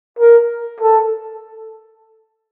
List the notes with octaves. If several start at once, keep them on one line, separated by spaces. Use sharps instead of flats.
A#4
A4